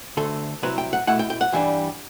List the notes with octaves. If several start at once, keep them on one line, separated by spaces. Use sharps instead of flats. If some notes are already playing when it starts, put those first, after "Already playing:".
D2 D3 A3 A4
C2 C3 F#3 E4 B4
G5
F#5
B2 A3 E4 F#5
G5
G5
F#5
G2 E3 G3 D4